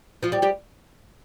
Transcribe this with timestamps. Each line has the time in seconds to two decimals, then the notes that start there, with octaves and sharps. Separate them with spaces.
0.23 F3 F4
0.32 G3 G4
0.42 G3 G4